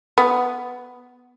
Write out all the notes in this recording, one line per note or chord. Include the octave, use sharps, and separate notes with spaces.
B3